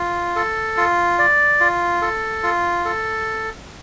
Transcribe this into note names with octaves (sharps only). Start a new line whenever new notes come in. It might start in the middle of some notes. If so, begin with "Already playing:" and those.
Already playing: F4
A4
F4
D5
F4
A4
F4
A4